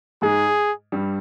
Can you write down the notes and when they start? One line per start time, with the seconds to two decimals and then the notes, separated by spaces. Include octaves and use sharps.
0.22 G#2 G#3 G#4
0.92 G2 G3